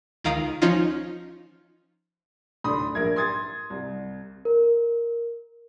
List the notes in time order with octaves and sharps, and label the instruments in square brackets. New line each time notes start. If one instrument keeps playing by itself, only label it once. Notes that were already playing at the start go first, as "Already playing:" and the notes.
[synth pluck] C#2 D#3 F5 A#5 D#6
F3 C#4 D#4 F4
[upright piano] D2 A2 D4 B5 C6 D#6
A#1 A#4 E5 G#6
C6 D#6 G#6 A6
C2
[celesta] A#4